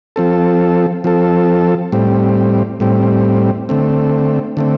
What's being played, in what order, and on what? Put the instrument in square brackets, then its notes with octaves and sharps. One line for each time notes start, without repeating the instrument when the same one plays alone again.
[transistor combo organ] F3 C4 A4
F3 C4 A4
A2 G3 C4
A2 G3 C4
D3 A3 C4
D3 A3 C4